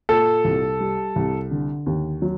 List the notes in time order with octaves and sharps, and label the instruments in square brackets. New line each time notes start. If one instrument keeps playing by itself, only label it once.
[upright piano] A#2 [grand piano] A4
[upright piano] C2
G3
C2
D3
D#2
F#3